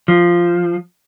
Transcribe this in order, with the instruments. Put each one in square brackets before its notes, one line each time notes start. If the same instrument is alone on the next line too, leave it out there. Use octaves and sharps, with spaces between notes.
[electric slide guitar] F3